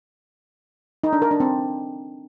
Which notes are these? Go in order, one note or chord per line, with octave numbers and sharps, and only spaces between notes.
D#4
D4
A#4
D4
C4